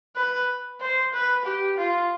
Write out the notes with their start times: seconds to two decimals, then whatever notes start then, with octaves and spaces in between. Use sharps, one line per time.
0.16 B4
0.80 C5
1.13 B4
1.46 G4
1.78 F4